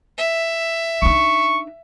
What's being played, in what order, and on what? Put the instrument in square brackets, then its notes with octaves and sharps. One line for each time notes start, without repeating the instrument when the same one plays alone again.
[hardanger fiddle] E5
[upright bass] D4 D#4 [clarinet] C#6